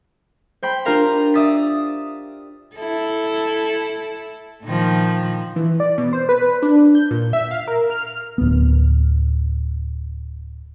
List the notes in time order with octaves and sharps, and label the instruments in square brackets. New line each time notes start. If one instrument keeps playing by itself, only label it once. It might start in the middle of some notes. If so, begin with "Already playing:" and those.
[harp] C5 G5 B5 B6
D4 F4 G4 A#4 F5 A#5
D5 E5 D#6 A6 B6
[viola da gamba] E4 A4
A#2 D#3 F3
[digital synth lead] E3
D5
B2
C5
B4
D4
G6
A#2
E5
F5
A#4
F6
[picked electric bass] D1 B3